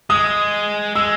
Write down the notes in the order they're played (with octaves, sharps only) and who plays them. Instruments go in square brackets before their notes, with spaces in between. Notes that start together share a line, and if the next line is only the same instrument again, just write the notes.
[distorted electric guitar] G#3 [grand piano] D#6
[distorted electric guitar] G#3 [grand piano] E6